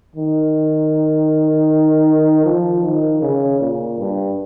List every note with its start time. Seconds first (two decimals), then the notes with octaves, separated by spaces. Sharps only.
0.15 D#3
2.45 F3
2.83 D#3
3.22 C#3
3.59 A#2
3.98 G2